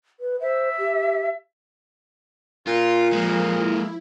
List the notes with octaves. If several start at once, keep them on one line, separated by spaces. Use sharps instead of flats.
B4
C5 E5
G4
A#2 F4
F3 G#3 A#3
E4